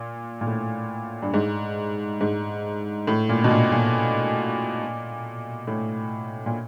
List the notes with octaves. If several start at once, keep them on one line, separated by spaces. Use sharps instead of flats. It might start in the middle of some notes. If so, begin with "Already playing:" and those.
Already playing: A#2
A#2
A2
G2
G#2
G#2
A2
A#2
B2
A#2
A#2
A2
A#2